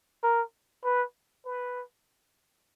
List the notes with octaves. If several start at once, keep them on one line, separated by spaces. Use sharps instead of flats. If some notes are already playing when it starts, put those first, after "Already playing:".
A#4
B4
B4